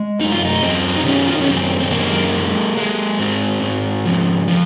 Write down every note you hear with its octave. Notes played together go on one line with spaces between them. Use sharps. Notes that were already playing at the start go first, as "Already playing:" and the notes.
Already playing: G#3
F#2 D#4
F4
D#4
F#2 C4
D#4
D#3 C#4
F4
D#4
C#4
F#2 C4
C4
G#3 A#3
G#3
G#3
G#2 C4
G#2
F3
F3